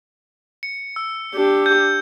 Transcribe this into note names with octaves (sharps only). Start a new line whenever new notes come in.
C#7
E6
D4 G4
G6